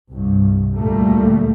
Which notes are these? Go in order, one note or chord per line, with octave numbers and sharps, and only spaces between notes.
C2 G2
D2 A#2 G3 A3 A#3